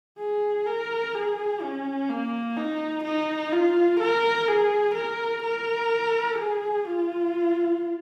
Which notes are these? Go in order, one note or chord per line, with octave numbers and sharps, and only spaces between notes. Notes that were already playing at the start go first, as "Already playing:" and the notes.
G#4
A#4
G#4
C#4
A#3
D#4
D#4
F4
A#4
G#4
A#4
A#4
G#4
F4